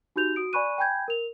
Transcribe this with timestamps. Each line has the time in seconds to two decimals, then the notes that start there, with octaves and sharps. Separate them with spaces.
0.16 D#4 F#4 G4 G6 F7
0.36 F#4 D#6 D7
0.53 D5 G#5 B5 C#6 F#6 D#7
0.78 G5 G#5 B5 G6 G#6
1.08 A#4 F7